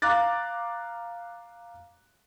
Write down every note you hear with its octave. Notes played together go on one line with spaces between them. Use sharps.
F5 A#5 D6 F#6 A6